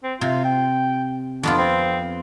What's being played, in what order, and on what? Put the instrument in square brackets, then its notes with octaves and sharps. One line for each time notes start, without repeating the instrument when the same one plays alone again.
[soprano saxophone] C4
[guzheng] C3 [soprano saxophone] F4
[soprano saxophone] G5
[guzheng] F2 B3 F4 [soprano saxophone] D4
[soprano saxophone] C4